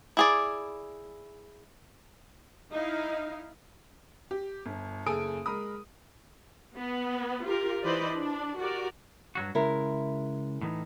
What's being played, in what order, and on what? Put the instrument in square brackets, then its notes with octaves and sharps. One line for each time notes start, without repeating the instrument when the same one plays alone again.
[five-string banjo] E4 G#4 D5
[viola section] D#4 E4 F5 [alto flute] D#5
[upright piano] G4
G1
F#1 C#3 A4 G#5 D#6 D7
G#3 A#4 B5 D#6
[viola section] B3
F4 G4 A#4
E3 D#4 B4 C5 D5 D#5
D4
F#4 G4 A#4 D5
[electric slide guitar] G2 F#3 F#4
[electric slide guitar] C#3 G#3 [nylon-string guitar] E4 A#4
[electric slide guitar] A2 E3 D#4